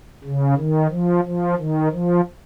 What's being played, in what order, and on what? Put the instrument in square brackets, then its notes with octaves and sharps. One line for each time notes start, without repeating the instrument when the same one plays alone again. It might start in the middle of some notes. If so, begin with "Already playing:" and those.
[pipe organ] C#3
D#3
F3
F3
D#3
F3